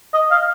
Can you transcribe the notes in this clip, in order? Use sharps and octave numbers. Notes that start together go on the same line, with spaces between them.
D#5
F5